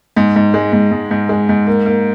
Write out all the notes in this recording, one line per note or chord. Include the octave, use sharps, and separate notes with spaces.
G#2
G#2
G#3
G#2
G#2
G#2
G#3
G#2
A#3
A#3